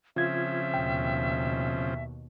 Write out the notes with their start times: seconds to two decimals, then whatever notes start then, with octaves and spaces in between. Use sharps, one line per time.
0.16 C#3 F3 C4 F4 E5 G#6
0.74 D#2 B2 G5